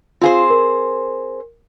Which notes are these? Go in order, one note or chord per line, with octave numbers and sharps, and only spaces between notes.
C4 F4 G#4 C5 F5
A#4